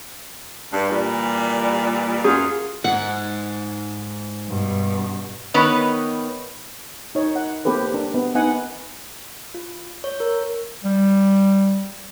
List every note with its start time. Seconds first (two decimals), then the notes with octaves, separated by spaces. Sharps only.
0.73 G2
0.90 A#2 E3 G3
2.24 F#2 F4 G#4
2.84 G#2 F#5
4.47 G2 B2
5.54 D#3 B3 B4 C#5 D#5
7.15 D#4 C#5
7.36 F#5
7.65 A#3 C4 G4 A4 B4
7.94 D4
8.14 B3
8.35 B3 D#4 F#5 G#5
9.54 F4
10.04 C#5
10.20 A#4
10.84 G3